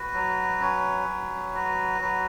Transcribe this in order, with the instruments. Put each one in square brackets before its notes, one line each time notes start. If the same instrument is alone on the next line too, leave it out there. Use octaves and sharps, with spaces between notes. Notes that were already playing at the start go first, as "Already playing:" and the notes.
Already playing: [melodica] F#4 B4
F#3
C#4
F#3
F#4
F#3 B4